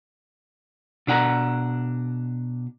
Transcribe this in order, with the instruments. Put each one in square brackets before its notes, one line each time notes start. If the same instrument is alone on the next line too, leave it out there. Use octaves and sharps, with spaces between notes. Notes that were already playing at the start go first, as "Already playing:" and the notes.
[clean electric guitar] B2 D4 F#5 A#5